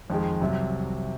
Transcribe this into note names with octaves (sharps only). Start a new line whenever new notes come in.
F2 D#3 G#3
C2 C3 F#3